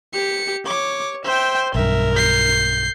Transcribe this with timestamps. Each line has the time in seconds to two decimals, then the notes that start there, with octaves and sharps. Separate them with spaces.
0.14 G4 C#7
0.66 C#5 D6
1.25 C5 E5 G5
1.75 B1 G2 A#4 E5
2.15 G6 C7